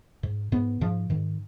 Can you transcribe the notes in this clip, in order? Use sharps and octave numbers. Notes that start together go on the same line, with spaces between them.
G#2
G#2 B3
G#2 F3
G#2 D#3